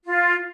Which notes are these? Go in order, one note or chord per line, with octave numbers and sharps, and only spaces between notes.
F4